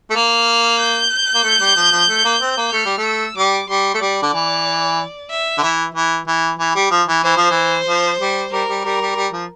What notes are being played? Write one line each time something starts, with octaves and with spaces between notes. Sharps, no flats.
A3
A#3 F6
G6
A#3
A3
G3
F3
F3
A3
A#3
C4
A#3
A3 F6
G3
A3
E6
G3 D6
G3 C6
A3
G3 D5
D3
E3
E5
D3
E3
E3
E3
E3
G3
F3
E3
E3 C5
F3
E3
F3
G3
G3 A#4
G3
G3 A#4
G3
G3
F3